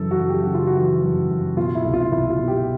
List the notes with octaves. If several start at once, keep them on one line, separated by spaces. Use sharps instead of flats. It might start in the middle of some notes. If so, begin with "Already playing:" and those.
Already playing: F#2 C#3 E3 A4
F#4
F#2
G4
C#3 F#4
F4
F#4
E3
F#2
F#2
B2 F4
E4
C2
F4
C2 E4
F4
B2
G4